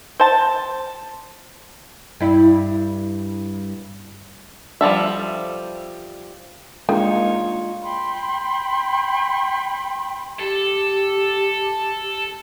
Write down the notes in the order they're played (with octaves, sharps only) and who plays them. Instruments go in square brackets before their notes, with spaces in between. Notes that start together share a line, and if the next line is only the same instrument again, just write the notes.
[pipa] C5 A5
[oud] G2 E4
[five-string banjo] F3 G3 A4 E5
[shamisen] D#3 [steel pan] G#3 D4 [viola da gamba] A#3 D#4 C#5 [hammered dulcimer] F4
[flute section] G5 B5 C6
[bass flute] G4 [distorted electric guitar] A4